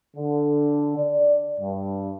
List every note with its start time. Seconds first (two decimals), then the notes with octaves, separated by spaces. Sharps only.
0.17 D3
0.97 D5
1.60 G2